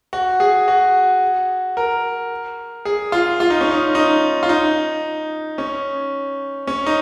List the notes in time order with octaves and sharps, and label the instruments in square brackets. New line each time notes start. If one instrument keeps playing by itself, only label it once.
[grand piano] F#4
G#4
F#4
A#4
G#4
F4
F4
D#4
C#4
D#4
D#4
F4
D#4
C#4
C#4
D#4